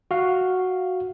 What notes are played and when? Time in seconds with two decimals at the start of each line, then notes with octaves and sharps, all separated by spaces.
0.11 F#4 F5